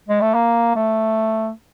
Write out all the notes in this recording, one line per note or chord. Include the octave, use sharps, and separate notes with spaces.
G#3
A3
A#3
A3